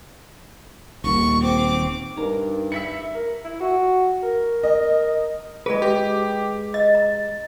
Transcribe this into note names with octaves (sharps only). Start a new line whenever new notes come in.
D#1 D#2 C#6
C4 D6
G2 D#4 A#4
E4 E5 B6 C#7
A#4
E4
F#4
A#4
D#5
G#3 G#4 B4 D5
G4
D#5 A6
A#5